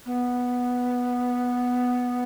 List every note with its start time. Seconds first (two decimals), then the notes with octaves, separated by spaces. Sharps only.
0.06 B3